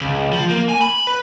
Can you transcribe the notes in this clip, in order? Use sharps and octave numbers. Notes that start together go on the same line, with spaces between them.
C#2
F3
A#3
G#5
B5
B4